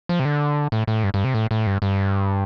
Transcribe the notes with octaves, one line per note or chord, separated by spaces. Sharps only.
F3
C3
D3
A2
A2
G2
G2
C3
A2
A2
G2
G2